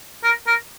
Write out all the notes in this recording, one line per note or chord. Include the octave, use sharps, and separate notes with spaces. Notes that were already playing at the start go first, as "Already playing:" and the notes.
A#4
A#4